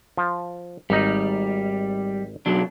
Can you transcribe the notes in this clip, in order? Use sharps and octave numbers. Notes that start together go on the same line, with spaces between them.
F3
G#1 G3 D#4
B2 F#3 D4